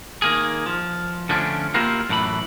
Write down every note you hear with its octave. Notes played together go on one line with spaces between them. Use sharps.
D#3 A#3 G#4
F3
D3 F3 A3 C#4 D4
A#3 E4 F4 G4 A#4 F5
F#2 A2 E3 B5